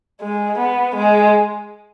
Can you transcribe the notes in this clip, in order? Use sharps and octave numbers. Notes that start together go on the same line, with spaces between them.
G#3
B3
G#3